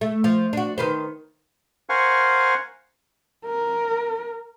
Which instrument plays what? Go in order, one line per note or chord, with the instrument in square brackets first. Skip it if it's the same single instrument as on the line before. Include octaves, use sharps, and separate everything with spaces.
[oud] A3
F3
D4 F#4
D#3 B4 C5
[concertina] A#4 C5 F5 F#5 G#5 C#6
[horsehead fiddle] A#4